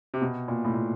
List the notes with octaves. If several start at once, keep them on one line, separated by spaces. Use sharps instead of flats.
C3
B2
A#2
A2
A#2